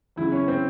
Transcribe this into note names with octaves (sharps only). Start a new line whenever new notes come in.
E2 C#3 F#3 E4
C#4
C4